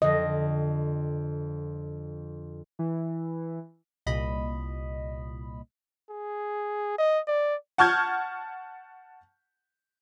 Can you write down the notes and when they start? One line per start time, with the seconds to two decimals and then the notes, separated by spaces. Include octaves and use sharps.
0.02 F2 D3 D#5
2.79 E3
4.06 C2 A#2 D#5 B5
6.10 G#4
6.98 D#5
7.27 D5
7.78 F#5 A5 C#6 F6 G6 G#6